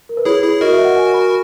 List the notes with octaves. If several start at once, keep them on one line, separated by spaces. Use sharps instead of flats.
A#4
B4
E4 G#4 C#5
E4 G#4
C#5
F#4 A#4 D#5
E5
F#5
G#5
B5